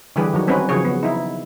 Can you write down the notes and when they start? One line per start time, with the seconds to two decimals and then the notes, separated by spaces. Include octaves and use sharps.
0.16 D3 E3 G3 G4 G#4 B4
0.33 D#3 F#3 C#5
0.47 G3 C4 C#4 D#4 F#4 B4
0.69 C#3 F3 F#3 G#4 C#5
0.85 B3
1.03 D#4 E4